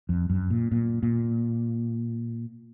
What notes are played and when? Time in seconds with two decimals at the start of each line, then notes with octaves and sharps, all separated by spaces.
0.09 F2
0.30 F#2
0.50 A#2
0.72 A#2
1.03 A#2